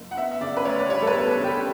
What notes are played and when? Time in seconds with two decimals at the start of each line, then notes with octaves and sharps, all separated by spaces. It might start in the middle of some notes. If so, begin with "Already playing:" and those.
Already playing: F#1
0.11 F#5
0.17 B3 E5
0.32 E5
0.41 C#3 D5
0.57 B4
0.65 D2 C#5
0.78 D5
0.89 G3 C#5
1.02 A4
1.07 B4
1.14 B3
1.26 A4
1.38 C#3
1.44 G4